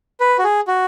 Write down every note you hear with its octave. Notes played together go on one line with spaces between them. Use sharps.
B4
F#4
G#4
F#4